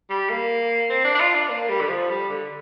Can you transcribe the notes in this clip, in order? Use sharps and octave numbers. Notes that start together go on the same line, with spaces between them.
G3
A#3
C4
D4
D4
F4
D4
A#3
G3
D3
F3
G3
D3